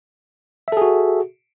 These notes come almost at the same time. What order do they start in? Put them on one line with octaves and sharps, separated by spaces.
E5 A4 G#4 F#4